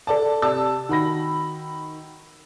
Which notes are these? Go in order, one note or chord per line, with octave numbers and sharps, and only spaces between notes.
A4 D5 A5
C3 D5 A5 E6
D#3 F#4 B5 A#6